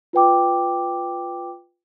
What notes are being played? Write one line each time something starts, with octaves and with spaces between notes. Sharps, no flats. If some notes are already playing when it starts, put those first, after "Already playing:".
F4 B4 G5 D6